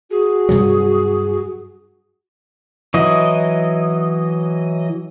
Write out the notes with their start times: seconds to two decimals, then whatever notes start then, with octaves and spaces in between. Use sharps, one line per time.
0.11 F#4 G#4
0.49 G2 C3 F#3
2.94 E3 F#3 D#5